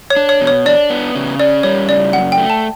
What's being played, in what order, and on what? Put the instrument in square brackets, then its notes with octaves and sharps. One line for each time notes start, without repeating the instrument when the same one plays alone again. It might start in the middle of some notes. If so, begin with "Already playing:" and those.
[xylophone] C#5
[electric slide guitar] D4
[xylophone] C#5
[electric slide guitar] B2
[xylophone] C#5
[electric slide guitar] D4 [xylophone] D5
[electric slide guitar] B3
C#3
[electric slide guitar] C#4 [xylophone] D5
[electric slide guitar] G3 [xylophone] C#5
[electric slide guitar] C#3 [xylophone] D5
[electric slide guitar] F#2 [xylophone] F#5
[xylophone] G5
[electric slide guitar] A3
[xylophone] A5